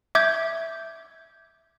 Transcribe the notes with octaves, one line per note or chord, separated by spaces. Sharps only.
E5 D6 G6 G#6